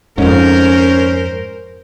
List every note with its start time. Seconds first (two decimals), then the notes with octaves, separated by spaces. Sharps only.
0.18 F2 G#2 C#4 A#4 C5